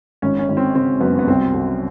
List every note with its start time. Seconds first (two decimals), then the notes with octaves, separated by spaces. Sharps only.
0.22 G#1 C#4
0.39 C#4
0.48 G#1
0.57 C4
0.75 C#3 C4
1.01 F#2 B3
1.19 B3
1.27 C2 C4
1.53 C2